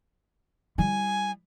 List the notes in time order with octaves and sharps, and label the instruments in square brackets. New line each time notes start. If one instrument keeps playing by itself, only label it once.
[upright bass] G3 E4 [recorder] G#5